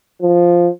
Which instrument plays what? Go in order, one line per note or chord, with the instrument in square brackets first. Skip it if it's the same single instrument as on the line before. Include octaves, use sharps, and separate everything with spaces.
[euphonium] F3